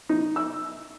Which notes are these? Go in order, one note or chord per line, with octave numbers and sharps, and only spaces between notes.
D#4
E6